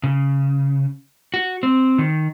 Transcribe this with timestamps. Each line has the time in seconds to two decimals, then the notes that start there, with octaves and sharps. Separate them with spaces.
0.04 C#3
1.34 F#4
1.63 C4
1.98 D#3